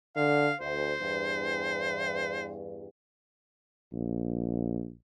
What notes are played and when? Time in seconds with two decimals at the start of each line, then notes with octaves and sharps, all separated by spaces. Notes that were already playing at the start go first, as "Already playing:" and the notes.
0.16 D3 F5
0.60 D2 C5
0.99 E2 G2
3.92 A#1